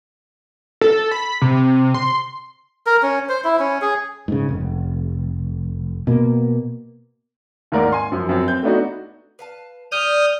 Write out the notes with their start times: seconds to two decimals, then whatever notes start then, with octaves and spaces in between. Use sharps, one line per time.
0.81 A4
1.12 B5
1.42 C3
1.94 C6
2.87 A#4
3.03 C#4
3.29 C5
3.44 E4
3.60 C#4
3.82 G#4
4.28 G#2 C#3
4.49 F1
6.07 B2 A#3
7.72 D#2 G#2 A#4 D5 F#5
7.92 G#5 C6
8.12 F#2 F3
8.29 F#2 C4
8.48 C4 G6
8.63 A3 B3 D4 D#4 F#4
9.39 B4 F5 A5
9.92 E3 G4 D5 D#6 F6 G6